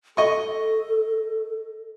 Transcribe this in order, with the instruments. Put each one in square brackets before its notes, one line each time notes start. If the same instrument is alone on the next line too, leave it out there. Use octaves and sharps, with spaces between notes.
[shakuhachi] A4 [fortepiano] D#5 C#6